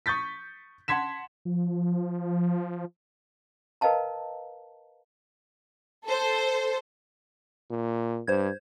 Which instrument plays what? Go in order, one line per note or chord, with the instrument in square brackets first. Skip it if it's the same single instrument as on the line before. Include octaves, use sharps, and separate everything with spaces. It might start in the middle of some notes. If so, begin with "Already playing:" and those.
[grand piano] C#6 D#6 G6 A6 B6
F#5 A5 C6 G#6 B6 E7
[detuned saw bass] F3
[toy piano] A#4 B4 D#5 F5 A5 A#5
[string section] A4 C5
[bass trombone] A#2
[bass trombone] G2 [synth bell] C5 G#6